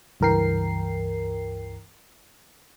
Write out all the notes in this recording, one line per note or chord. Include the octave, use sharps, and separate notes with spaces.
C#2 G2 E3 A#4 G5 C7